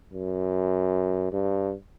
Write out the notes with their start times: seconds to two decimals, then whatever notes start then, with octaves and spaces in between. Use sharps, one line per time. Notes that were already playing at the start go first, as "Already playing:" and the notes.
0.13 F#2
1.32 G2